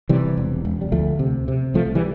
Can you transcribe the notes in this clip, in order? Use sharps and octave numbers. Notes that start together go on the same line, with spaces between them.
C3 E3 G3
E1
E1
G3
D2 F3 A3
C3
C3
C2 F3 A3
E3 G3